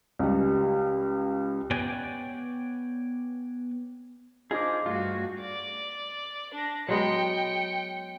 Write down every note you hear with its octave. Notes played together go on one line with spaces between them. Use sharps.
C#2 G3
B3 B4 C#5 D5 G5 G#5
D4 D#4 F4 G#4 C5 D6
G2 A3 F4 F#4 F5
D5
D4 A#6
F#3 G#3 B3 G5 C#7